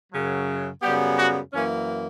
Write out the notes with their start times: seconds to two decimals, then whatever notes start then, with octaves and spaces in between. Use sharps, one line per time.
0.13 F#2 C#3 F#3
0.82 F#2 C#3 G3 B3 G4
1.17 F#4
1.53 F#2 E3 A#3 C#4